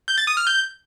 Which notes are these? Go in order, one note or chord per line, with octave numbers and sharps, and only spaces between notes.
G6
A6
D#6
F6
G6